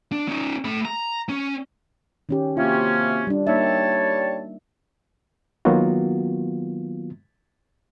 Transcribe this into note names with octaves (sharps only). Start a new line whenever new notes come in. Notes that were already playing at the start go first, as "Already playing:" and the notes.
D4
C#4 D#4
A3 B5
A#5
C#4
D#3 C#4 G4
C3 A#3 C#4 F4 F#4
G3 D4
G3 A#3 D#4 C#5 E5 A5
D#3 F#3 A#3 B3 F4 F#4